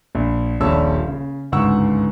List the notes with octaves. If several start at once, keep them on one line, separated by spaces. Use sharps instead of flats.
A#1
D#1 A#1 G3 C#5 A5 E6
C#3
G1 C#2 G#2 F#5 C#6 E6